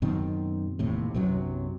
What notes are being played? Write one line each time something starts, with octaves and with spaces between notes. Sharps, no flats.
F#2 B2 D#3 C4
E1 D#2 A2 C3
B1 F#2 C3 F#3